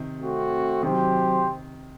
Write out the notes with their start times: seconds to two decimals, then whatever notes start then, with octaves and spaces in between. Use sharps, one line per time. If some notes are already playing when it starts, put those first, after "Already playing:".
Already playing: C3 D#3
0.15 A3 C4 F#4
0.83 C3 D#3 F#3 C4 G4 C5